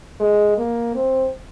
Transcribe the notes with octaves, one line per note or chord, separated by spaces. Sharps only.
G#3
A#3
C4